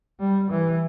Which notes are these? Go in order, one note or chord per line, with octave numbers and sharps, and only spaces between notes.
G3
E3